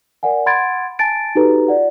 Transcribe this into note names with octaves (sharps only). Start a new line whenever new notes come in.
A#4 D5 F#5 G#5
F#5 B5 C6 G#6 A6 D7
G#5 A5 A6 D7
D#4 F#4 G4 A4 B4 A#5
F4 D5 F#5